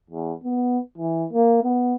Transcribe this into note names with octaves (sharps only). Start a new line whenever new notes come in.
E2
B3
E3
A#3
B3